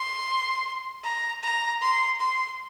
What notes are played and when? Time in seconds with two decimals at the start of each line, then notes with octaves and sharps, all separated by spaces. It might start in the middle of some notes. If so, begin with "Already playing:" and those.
Already playing: C6
1.03 A#5
1.43 A#5
1.82 C6
2.20 C6